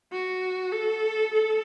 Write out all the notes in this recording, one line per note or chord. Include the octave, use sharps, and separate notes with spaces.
F#4
A4
A4